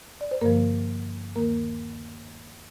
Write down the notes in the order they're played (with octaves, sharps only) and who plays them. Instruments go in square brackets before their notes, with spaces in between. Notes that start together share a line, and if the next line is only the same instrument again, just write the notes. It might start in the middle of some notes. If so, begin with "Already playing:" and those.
[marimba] D5
C5
G2 D3 F3 A#3 A#4
D#2 D#3 A#3 A#4